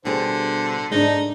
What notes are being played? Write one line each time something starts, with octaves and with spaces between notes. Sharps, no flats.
B2 D3 G3 G#4 C5
G#2 G#3 D4 D#4